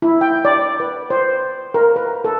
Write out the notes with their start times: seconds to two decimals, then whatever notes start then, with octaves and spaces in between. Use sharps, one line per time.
0.02 E4
0.21 G5
0.45 D5
0.80 B4
1.10 C5
1.74 A#4
1.96 B4
2.24 A4